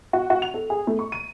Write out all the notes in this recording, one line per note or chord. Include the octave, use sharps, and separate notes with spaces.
F#4
F#4
F7
A4
G#4
A3
C#6
D#7